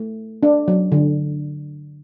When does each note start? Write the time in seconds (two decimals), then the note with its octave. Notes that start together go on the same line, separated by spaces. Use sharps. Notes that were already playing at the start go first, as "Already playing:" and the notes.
Already playing: A3
0.43 D4
0.68 F#3
0.92 D3